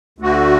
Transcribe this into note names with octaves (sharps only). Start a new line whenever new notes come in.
D2 D3 A3 F#4